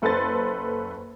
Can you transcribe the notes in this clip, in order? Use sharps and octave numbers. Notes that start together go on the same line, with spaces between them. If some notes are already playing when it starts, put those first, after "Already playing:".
F#1 A4 B4 C5 C6 A6